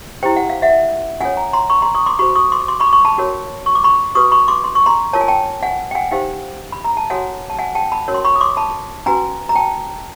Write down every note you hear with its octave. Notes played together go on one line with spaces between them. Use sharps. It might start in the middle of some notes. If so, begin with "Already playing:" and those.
E4 G4 C5 G5
F#5
F5
E5 F#5
C#4 F4 A4 C#5 F#5 G#5
G#5 A#5
A#5 C6
B5 C#6
A#5 C6
C#6 D#6
C6 D6
F#4 A4 C5 B5 C#6
C#6 D#6
C6 D6
C6 D6
B5 C#6
D6
B5 C#6
A5 B5
C#4 F#4 A#4 C#5
C#6
D6
B5 C#6
F#4 B4 C#6 D#6
B5 C#6
C6 D6
C6
C#6
A#5 C6
F4 A#4 C#5 A5
G#5
G5 A5
F#5 G#5
G5
F#5 G#5
D#4 G4 C5 F5 G5
B5
A#5
A5
F#4 A4 C#5 F#5 G#5
A5
F#5 G#5
G5 A5
A5 B5
C#4 F#4 A#4 C#5
C6
B5 C#6
D#6
C6 D6
A5 B5
C#4 F#4 B4 G#5 A#5
A#5
G5 A5